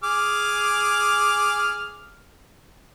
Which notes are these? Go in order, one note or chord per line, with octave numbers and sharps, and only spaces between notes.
G#4 D6 F6